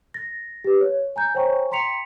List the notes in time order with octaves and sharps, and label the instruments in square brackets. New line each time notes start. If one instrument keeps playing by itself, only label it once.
[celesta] A6 A#6
G4 B4
C#5
G#5 A#5 G6
C5 C#5 G5 G#5 A#5 C#6
G5 A#5 C6 B6 C#7 F7